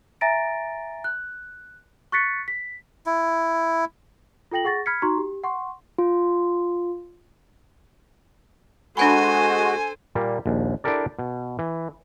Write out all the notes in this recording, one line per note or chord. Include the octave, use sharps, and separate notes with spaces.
E5 G#5 A#5 A6 A#6 D7
F#6
C#6 F#6 A6 B6 C#7
B6
E4
F4 A4 G5 A#6 F#7
G#4 F#5 C#6 A6 A#6
B5 F6 G#6 B6 C#7
D#4 F#4 A#5 C6 C#6
G4
F#5 C6 C#6
F4
G#3 D4 F#4 A4 C5 F#5 G#5 B5
A#2 G3 A#3
A#1 D#2
D4 E4 G4 A4 A#4 D5
B2
E3